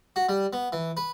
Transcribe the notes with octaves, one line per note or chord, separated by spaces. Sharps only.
F#4
G3
B3
E3
B4